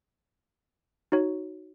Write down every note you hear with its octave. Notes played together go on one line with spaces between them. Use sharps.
D#4 F#4 C#5